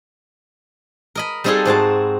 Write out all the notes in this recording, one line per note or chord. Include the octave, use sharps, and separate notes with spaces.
A#4 D#5 B5
G3 C4 D#4 F4 G#4 A4
G#2 C4 F#4 A5